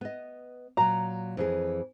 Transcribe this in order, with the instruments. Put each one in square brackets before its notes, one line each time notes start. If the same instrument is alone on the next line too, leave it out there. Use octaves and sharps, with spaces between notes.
[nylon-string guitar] B3 D#5
[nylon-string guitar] A#2 F#3 [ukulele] A#5
[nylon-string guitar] F2 E3 G#4